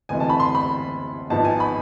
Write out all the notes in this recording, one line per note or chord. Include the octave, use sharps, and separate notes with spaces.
D2 C3 E3 G#3 G#5
A5
B5
C6
B5
G#1 G#2 F3 B3 A5
G#5
B5